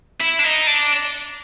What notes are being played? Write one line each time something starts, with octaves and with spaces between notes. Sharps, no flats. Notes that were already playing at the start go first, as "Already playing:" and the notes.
E4
D4
D#4
D4